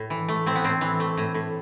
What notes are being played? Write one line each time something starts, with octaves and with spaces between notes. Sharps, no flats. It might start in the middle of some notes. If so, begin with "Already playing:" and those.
Already playing: A2 A3
E3
A3
A2 C4
B3
A2 C4
E3
A3
A2
A2